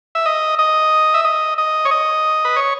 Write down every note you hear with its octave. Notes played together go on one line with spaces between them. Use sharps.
E5
D#5
D#5
E5
D#5
D#5
C#5
D#5
B4
C#5